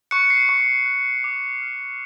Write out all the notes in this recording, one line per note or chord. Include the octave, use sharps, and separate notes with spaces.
C#6 F#6 C#7
C7
C#6
F#6
D6
F6